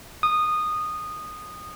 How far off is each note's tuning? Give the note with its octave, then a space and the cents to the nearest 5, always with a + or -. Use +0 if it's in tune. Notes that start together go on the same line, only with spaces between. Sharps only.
D#6 -15